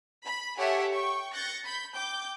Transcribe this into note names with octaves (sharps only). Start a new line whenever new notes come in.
B5
G4 A4 C#5 E5 F#5 G#5
G5 C#6
F#6 G6 A6 A#6 C#7
B5 G6
G5 D6 G6